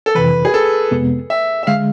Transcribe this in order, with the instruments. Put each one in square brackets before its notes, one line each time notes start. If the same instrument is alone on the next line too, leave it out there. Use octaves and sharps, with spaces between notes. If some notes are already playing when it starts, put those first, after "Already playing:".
[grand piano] A4
[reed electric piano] F2 C3 E3 [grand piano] B4
[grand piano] G#4
A4
[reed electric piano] F2 C3 G#3 B3
[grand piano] E5
E5
[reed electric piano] D3 G#3 [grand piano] F5